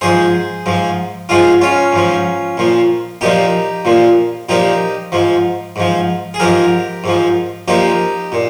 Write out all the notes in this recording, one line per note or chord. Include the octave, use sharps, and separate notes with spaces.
G#2 F3 G#4 C5
G#2 F3
G#2 F3 F4 G#4
C#4 F4
G#2 F3
A#2 F3
A#2 F3 D#4 G4
A#2 F3
A#2 F3 D#4 G4
G#2 F3
G#2 F3
G#4
G#2 F3 G4 A#4
G#2 F3
A#2 F3 D#4 G4
A#2